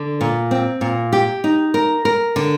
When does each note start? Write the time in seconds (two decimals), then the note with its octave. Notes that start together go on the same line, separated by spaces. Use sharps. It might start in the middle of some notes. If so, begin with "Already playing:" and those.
Already playing: D3
0.21 A#2
0.51 C4
0.81 A#2
1.12 G4
1.44 D#4
1.74 A#4
2.05 A#4
2.36 D3